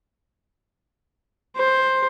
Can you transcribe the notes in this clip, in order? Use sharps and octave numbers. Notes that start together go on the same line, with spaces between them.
C5